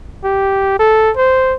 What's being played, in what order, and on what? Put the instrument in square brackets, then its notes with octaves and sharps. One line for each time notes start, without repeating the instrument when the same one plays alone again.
[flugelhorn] G4
A4
C5